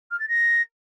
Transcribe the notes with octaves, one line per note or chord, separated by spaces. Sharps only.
F6
A6
A#6